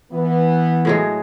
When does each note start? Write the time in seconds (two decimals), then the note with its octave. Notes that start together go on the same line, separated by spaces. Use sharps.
0.12 E3 B3
0.85 A2 F#3 G#3